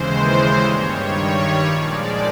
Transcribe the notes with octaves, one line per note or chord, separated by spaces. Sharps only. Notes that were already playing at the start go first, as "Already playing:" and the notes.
Already playing: D#2 C#3 E3 G#3 C5
G2 D#3 G3 C#5
A#2 F3 G#3 D5